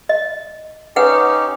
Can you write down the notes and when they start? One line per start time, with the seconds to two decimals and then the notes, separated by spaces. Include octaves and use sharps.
0.09 D#5
0.96 C#4 D#4 G4 B4 F#5 G5